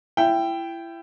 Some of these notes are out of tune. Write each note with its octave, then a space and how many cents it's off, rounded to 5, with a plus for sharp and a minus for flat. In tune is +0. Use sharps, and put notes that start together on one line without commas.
E4 +25 G5 +0